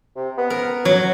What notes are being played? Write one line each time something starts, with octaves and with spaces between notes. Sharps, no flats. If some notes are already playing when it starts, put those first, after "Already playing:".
C3
B3
A#4
F#3